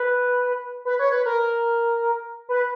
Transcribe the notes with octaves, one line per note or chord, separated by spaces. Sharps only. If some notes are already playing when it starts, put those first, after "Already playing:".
Already playing: B4
B4
C#5
B4
A#4
B4